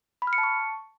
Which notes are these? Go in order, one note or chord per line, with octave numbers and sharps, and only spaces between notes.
B5
F6
C#7
A5
C#6